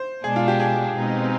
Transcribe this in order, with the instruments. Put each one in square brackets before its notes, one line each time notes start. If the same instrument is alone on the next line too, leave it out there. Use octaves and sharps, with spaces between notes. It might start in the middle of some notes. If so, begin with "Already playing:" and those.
Already playing: [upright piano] C5
[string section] B2 G#3 D4 [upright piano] G#4
[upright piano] F4
G4
G#4
[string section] B2 G#3 C4 D#4